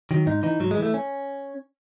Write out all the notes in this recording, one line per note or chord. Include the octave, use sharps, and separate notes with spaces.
D#3 F#3
G#2 D#4
E3 D#4
G#2 F#3
G#3
E3
A3
C#4